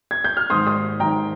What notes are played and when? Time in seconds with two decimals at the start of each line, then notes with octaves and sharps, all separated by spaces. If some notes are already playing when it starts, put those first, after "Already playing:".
0.11 G#6
0.24 G6
0.37 F6
0.50 G#2 D#3 C6 D#6
0.67 C6 D#6
1.00 G#2 D#3 G5 A#5